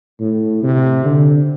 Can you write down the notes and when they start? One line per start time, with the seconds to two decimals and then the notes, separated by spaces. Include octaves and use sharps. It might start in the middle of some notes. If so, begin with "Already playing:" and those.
0.20 A2
0.63 C3
1.05 D3